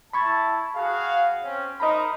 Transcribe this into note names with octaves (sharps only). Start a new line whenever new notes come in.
E4 A5 B5 C#6 G#6
F#4 G#4 F5
C4 C#4
D#4 A#4 C5 D#5 A#5 B5